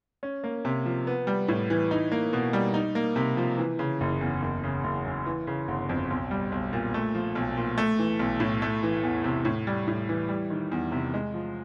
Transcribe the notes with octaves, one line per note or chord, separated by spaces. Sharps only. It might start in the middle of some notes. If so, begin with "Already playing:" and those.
C#4
A#3
C3
F3
B3
G3
A2
E3
D#4
A#3
B2
G3
D#4
A#3
C3
F3
E3
C#3
F#1
E2
F#1
C#3
F#1
F#2
E3
C#3
G1
F2
B1
G3
B1
A#2
A3
F3
B1
A#2
A3
E3
B1
A2
A3
E3
E2
C3
A2
G3
A2
E3
G3
D#3
E2
C3
G#3
F3